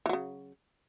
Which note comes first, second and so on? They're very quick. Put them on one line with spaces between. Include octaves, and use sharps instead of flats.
E3 F#3 C#3